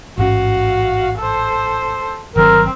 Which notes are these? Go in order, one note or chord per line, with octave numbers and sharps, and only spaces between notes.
A1 G#2 C#4 F#4 F5
A4 C5
G1 D#3 F#3 C4 A#4